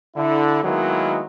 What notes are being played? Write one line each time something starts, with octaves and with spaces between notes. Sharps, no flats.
D3 E4
D#3 F#3 G#3 A#3 B3 E4